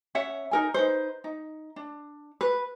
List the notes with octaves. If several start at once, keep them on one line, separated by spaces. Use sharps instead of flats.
C#4 C#5 E5 F#5
D#4 A#4 G#5
D#4 B4 C5
D#4
D4
B4